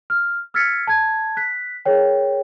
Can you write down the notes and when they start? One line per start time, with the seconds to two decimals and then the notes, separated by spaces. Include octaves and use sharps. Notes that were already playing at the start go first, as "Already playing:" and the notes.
0.10 F6
0.54 E6 F6 G#6 A6 B6 C#7
0.87 A5 G#6
1.37 F#6 B6
1.85 G#4 A#4 C#5 G5